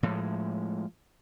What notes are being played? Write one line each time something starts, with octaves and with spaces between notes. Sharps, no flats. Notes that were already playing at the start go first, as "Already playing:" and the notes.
A2 F3 G#3